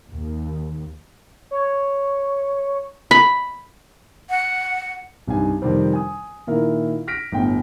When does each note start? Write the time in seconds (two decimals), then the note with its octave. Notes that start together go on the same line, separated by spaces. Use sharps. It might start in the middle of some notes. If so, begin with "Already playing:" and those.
0.10 D#2
1.51 C#5
3.11 B5
4.30 F#5
5.27 C2 G2 D#4 G#5
5.62 F2 C3 D#3 G3 C4
5.93 G#5 D#6
6.47 A#2 D#3 E4 A#4
7.07 F6 A#6 B6 D7
7.32 G1 A2 G5